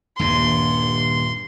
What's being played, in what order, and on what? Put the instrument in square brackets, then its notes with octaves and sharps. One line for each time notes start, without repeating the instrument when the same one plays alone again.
[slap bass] D#1 G2 [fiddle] C6